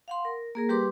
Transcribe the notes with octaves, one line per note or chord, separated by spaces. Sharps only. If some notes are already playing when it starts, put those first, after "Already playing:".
F5 F#5 C6
A#4
A#3 G#4 A#4
G3 G4 B4 C6 D6